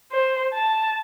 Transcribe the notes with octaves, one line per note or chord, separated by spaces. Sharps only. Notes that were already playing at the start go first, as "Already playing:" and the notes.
C5
A5